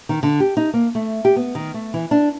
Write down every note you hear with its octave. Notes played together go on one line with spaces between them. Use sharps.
D#3
D3
G4
D#4
A#3
A3
G4
B3
D#3
A3
E3
D4